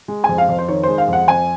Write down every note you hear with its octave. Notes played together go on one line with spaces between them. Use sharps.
G#3
F2 G#5
F5
F2
C5
D#3 C#5
G#3 C5
F5
F2 F#5
F2 G#5